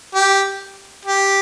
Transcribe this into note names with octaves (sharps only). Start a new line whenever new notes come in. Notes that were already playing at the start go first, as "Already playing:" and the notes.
G4
G4